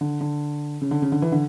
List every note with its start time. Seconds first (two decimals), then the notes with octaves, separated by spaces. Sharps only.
0.01 D3
0.21 D3
0.81 C#3
0.91 D3
1.02 C#3
1.12 D3
1.22 E3
1.32 D3